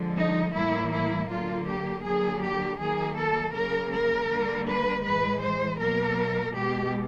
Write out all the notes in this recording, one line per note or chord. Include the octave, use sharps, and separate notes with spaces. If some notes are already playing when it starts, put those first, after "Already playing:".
Already playing: D3 F3 G#3
D#4
A2 E3 G3 A#3 E4
E4
D3 F#3 A#3 F4
G4
D3 F#3 A#3 G#4
G4
D#3 F#3 A#3 G#4
A4
C#3 F#3 A#3 A#4
A#4
D3 G3 A#3
B4
A2 E3 G#3 B4
C5
B2 F#3 A#3 A#4
B2 G#3 G4